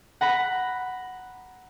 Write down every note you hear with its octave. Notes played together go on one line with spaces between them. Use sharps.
F#5 A#5 B5